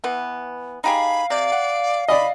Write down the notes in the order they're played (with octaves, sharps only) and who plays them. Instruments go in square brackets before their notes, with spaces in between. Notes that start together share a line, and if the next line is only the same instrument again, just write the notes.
[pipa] E3 B3
[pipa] D#4 G4 G#4 [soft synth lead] F5 [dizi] B5
[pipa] C3 [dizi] D5
[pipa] F#5
[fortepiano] D5 D#5 [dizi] B5